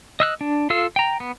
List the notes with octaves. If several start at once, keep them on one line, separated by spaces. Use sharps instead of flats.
D#5 E6 F#6
D4
F4 A4 F5 E6
G5 A#5
B3